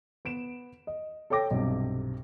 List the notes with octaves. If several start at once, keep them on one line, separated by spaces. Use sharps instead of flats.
B3 D7 E7
D#5
A4 C#5 G5 D6 A#6
B1 G2 C3